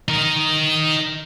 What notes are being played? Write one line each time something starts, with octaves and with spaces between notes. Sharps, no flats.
D#4 A#4